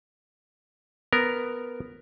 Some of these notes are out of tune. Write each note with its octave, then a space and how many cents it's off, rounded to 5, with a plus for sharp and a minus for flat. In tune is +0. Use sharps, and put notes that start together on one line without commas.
B3 +0 A#4 +0